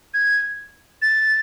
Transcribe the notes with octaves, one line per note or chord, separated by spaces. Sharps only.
G#6
A6